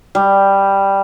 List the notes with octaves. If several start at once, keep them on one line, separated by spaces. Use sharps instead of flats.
G3